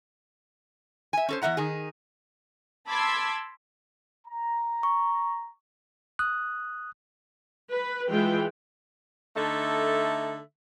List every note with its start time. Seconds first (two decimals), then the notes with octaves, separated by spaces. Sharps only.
1.13 E5 G#5
1.29 C#4 A4 C5
1.42 E2 G3 E5 F#5 A#5
1.57 D#3 D#4 G#4
2.89 A5 B5 C6 D6 E6 G#6
4.27 A#5
4.83 C#6
6.19 D#6 F#6
7.71 B4
8.10 E3 G#3 F4 G5
9.37 D3 A3 D#4 A4 E5